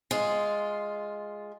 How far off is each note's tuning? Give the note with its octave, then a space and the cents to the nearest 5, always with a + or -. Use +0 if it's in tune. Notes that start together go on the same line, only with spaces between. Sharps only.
G#3 +0 F4 +0